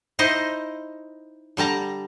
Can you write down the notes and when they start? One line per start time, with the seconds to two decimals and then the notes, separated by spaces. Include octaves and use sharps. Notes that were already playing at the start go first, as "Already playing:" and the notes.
0.19 D#4 E4 C5 D#5
1.57 D3 G3 A5 A#5